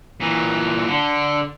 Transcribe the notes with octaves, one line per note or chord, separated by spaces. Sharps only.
A#2 E3
D3